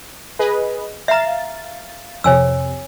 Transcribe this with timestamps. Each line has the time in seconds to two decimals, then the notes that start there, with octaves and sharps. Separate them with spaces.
0.39 G#4 B4 D#5
1.08 E5 F5 A#5 A6
2.24 F2 C3 C#5 G#5 E6